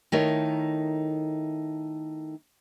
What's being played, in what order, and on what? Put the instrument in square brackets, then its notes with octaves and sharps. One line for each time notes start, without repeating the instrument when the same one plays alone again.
[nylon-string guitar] D#3 A3 D#4 E4 A#4 C#5